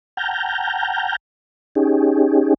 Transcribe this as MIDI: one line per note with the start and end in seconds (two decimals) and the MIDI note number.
0.17 1.16 78
0.17 1.16 79
0.17 1.16 81
0.17 1.16 82
0.17 1.16 89
0.17 1.16 91
1.75 2.54 61
1.75 2.54 63
1.75 2.54 67
1.75 2.54 68